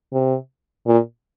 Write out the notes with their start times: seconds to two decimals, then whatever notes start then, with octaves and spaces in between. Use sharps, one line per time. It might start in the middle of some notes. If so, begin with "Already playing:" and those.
0.13 C3
0.87 A#2